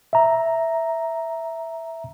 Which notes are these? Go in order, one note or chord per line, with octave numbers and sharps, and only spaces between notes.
E5 A#5